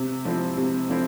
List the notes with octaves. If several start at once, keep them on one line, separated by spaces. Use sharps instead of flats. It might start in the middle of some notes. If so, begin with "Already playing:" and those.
Already playing: C3
F3 C4 E4
C3
F3 C4 E4